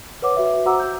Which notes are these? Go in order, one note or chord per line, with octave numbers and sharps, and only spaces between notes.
B4 C#5 F#5 D6
F#4 B4 E5
F#4 C5 F#5 A#5 D6 E6
E6 G6